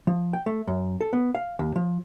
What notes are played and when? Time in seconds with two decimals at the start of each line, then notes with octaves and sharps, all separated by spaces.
0.07 F3
0.33 G5
0.46 A3
0.67 F#2
1.01 A4
1.13 B3
1.35 F5
1.59 D#2
1.76 F3